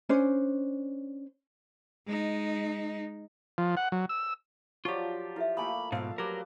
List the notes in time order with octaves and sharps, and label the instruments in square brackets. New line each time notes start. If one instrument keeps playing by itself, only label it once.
[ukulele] C#4 D4 C5
[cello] G#3 D#4
[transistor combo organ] F3
F#5
F#3
E6
[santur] F3 F#3 D5 [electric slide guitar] F4 G4 [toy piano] C#6
[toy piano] E4 A4 E5 [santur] F5
[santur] A3 A#3 [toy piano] A4 G#5 D#6 [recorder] B5
[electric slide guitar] G#2 B2 [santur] F3 E5 [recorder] F5
[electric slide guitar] F#3 A#4 [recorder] G4 [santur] B4 D6